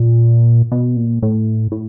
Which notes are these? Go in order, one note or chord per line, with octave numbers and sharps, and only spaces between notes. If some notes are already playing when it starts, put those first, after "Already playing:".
Already playing: A#2
B2
A#2
A2
A2